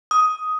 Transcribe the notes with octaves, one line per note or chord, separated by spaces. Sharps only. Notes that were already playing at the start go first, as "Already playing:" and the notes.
D#6